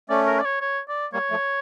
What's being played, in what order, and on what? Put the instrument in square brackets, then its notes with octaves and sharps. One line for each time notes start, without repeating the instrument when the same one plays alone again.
[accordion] A3 C#4 [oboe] D5
[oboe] A#4
D5
C#5
C#5
D5
[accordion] G3 A#3 [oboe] C#5
[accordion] F3 A3